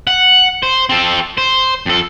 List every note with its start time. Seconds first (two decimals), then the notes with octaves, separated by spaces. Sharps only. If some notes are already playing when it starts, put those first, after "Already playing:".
0.07 F#5
0.63 C5
0.89 C4 A4
1.38 C5
1.86 F2 A4